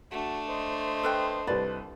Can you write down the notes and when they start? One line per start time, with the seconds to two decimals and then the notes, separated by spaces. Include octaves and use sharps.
0.11 A3 D4 F#4
0.48 C5 D#5
1.03 A4 B4 G5
1.47 C2 B4 D5